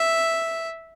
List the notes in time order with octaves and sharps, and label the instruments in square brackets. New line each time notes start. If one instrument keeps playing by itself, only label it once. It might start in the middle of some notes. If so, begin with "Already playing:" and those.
Already playing: [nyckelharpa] E5